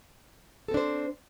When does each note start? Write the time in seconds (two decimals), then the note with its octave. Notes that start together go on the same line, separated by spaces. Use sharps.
0.68 A4
0.71 C4
0.74 D4
0.77 C5